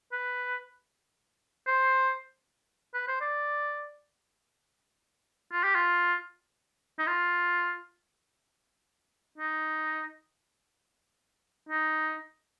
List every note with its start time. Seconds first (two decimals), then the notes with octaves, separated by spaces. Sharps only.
0.12 B4
1.67 C5
2.94 B4
3.08 C5
3.21 D5
5.53 F4
5.64 G4
5.75 F4
6.99 D#4
7.07 F4
9.38 D#4
11.69 D#4